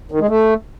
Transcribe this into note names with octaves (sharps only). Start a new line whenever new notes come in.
D#3
G#3
A3